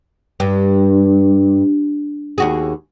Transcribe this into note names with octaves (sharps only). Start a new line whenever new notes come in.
G2
D#2 F#4 G#4